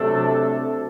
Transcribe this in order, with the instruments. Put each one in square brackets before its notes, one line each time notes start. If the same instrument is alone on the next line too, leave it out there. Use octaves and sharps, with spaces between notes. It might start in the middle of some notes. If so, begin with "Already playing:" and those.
Already playing: [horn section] C3 F#3 A3 D4 A4